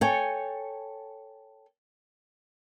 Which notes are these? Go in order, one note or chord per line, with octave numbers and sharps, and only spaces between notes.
A4 C#5 G5 G#5